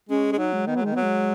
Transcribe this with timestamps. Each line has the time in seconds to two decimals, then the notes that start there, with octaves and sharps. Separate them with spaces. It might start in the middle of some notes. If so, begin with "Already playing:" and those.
0.09 G#3 C#4
0.32 G#3
0.38 F#3 D#4
0.53 G#3
0.67 D#3 B3
0.76 F#3
0.82 D#3 G#3
0.92 F#3 B3
1.03 G#3